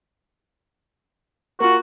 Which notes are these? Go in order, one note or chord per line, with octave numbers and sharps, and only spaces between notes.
A#3 F4 F#4